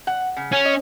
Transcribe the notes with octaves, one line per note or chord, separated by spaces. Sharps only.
F#5
C#3
C#4
D#5